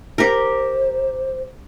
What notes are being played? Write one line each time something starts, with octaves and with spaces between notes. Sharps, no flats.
G4 A#4 C5